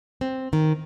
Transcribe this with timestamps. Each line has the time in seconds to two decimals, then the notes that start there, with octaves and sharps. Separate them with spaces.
0.21 C4
0.53 D#3